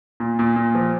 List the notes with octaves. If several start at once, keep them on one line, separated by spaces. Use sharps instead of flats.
A#2
A#2
A#2
F3